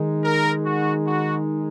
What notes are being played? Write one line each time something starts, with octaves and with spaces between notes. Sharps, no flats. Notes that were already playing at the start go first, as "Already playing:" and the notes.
Already playing: D#3 G#3 D#4
A#4
F#4
F#4